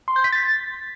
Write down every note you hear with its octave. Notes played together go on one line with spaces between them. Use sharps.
C6
G6
B6
A6